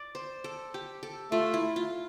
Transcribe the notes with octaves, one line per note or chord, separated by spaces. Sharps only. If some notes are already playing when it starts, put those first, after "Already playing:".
Already playing: D5
C5
A4
G4
A4
A3 F4
E4
F4